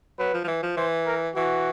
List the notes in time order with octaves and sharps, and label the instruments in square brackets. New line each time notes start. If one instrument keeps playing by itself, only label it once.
[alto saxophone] F#3 [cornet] B4
[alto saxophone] F3
F3
E3
F3
[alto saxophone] E3 [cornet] C5
[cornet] A#4
[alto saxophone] E3 [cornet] F#4